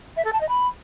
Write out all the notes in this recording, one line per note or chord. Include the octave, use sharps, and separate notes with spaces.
E5
A4
A5
D#5
B5